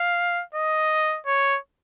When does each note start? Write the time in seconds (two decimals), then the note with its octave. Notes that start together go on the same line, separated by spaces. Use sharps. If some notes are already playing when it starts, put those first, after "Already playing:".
Already playing: F5
0.55 D#5
1.26 C#5